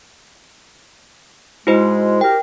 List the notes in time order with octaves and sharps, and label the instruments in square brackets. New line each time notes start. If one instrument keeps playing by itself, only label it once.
[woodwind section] G#2 G#3 [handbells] E4 F#4 C5
[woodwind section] G4 A#4 [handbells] G5